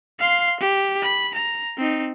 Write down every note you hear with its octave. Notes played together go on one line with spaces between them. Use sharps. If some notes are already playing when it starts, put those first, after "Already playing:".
F5 C6
G4
B5
A#5
C4 D#4